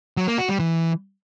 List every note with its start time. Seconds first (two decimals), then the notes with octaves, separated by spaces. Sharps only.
0.17 F#3
0.28 A#3
0.38 F#4
0.49 G3
0.60 E3